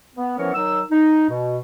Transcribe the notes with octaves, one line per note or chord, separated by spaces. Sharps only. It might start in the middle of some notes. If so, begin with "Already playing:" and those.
B3
E3 F3 B3 C#4 A#4 C#5
D#3 F#3 D#4 E6
D#4
B2